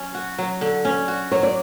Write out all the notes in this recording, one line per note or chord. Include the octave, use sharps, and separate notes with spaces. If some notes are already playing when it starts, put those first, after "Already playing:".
Already playing: F#3 C#4
F#4
F#3
D3
C#4 D5
F#4
F#3 C#5
D5